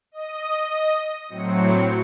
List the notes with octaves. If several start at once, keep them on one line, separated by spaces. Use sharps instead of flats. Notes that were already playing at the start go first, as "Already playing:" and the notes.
D#5 D#6
A2 F#3 C4 C#7